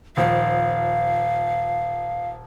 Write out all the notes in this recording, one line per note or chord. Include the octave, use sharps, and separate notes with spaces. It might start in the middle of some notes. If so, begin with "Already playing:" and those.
D#1 F3 F5